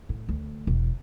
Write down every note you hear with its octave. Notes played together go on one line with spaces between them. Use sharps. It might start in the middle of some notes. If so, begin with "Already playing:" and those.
A2
D2
E1